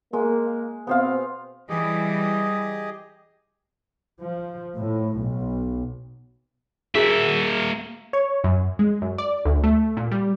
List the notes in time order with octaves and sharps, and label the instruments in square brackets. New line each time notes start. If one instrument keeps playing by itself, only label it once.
[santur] G#3 [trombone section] A#3
[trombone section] B2 C4 [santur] B3 C5 F5
[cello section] E3 G3 [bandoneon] G4 G#4 D#5
[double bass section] F3
A2
B1
[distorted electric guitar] A#3 E5 [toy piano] D4 F#4 G#4
[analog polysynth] C#5
F#2
G#3
F#2
D5
D2
A3
A#2
G3